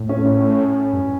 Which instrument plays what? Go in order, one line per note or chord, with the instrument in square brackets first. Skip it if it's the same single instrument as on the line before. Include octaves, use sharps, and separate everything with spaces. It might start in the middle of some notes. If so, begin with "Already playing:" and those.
Already playing: [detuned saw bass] A2
[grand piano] C#4
[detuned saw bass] G2